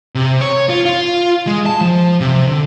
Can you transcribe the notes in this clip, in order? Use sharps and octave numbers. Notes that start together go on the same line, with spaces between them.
C3
C#5
F4
F4
G#3
A5
F3
C3
D3